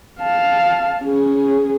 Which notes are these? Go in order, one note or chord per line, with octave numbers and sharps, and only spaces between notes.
F5 A5
C#4 G#4